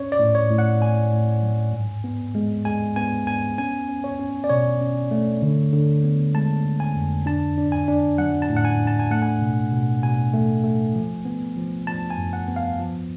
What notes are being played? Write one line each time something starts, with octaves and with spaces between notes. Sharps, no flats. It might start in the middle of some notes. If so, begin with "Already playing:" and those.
Already playing: C#4 C#5
D5
A2
C#5
A2
F#5
A2 G#5
A2
F#3
G#2
B3
G#3
G#3 G#5
B3 G#5
B3 G#5
C#4 G#5
C#4
C#5
C#4
D5
B2 C#5
C#4
A3
D3
D3
B3
G#3 A5
D3
G#5
F2
D4 A5
D4
G#5
D4
F#3 F#5
A5
A2
F#5
G#5
D4
A5
G#5
A3 F#5
G#5
B2
B2
B2 G#5
A3
A3
F3
B3
F3
F3 A5
G#5
F#2
F#5
B3
F5
F3